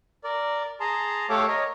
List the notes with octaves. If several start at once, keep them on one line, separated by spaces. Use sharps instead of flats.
A#4 D5
G#4 A5 A#5 C6
A3 G4 A4 C#5 F5 D6
A#4 C#5 D#5